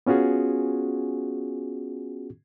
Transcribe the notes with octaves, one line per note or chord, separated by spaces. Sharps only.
B3 C#4 F4 F#4 G#4